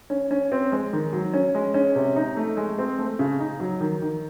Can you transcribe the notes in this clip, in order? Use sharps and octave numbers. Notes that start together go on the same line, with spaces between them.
C#4
C#4
C4
G#3
D#3
F#3
C#4
G#3
C#4
C3
D#4
A3
G#3
C4
A3
C#3
D#4
F#3
D#3
D#3